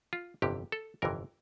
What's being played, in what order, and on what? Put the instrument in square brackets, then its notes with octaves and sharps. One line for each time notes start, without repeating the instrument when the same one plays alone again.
[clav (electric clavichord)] F4
G1 F2 C3 E3 G4
A4
G1 F2 C3 E3 A#4